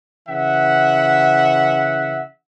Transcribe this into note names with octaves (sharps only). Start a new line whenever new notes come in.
C#3 E3 E5 F#5